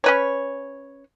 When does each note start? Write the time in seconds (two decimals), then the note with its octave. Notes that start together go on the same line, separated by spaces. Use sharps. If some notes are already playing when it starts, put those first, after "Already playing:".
0.04 C#4 B4 C#5